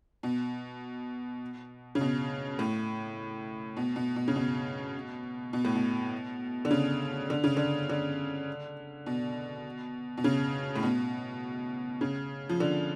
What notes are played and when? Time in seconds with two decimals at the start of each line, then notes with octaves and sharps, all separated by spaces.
0.23 B2
1.95 C#3
2.01 B2
2.59 A2
3.77 B2
3.96 B2
4.16 B2
4.28 C#3
4.36 B2
5.53 B2
5.65 A2
5.75 B2
6.65 D3
6.71 C#3
7.30 D3
7.44 C#3
7.57 D3
7.89 D3
9.06 B2
10.18 B2
10.24 C#3
10.76 A2
10.83 B2
12.01 C#3
12.49 F3
12.60 D3